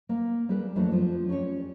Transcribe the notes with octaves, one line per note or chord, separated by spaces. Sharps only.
A#3
G3 E4 G4 G#4 A#4 B4
F2 E3 F#3 A3 A#3 D4
F3 C4
C#4 G4 A#4 C#5 D5